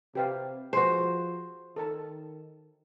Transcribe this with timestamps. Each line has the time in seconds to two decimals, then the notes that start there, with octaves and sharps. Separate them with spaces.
0.15 C3 G4 B4 F5
0.73 F3 F#4 G#4 B4 C5
1.76 D#3 A4 A#4 A5